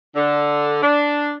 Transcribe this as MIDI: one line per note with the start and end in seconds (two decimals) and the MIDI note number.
0.15 0.81 50
0.83 1.34 62